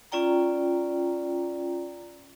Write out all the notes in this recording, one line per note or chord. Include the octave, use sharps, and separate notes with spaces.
C#4 F4 D5 G5 A#5